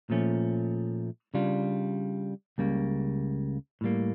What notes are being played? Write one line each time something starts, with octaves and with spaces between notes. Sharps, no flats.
A#2 F3 A3 C#4
C#3 G3 D4 F4
C#2 C#3 G3 A#3
A2 G3 A#3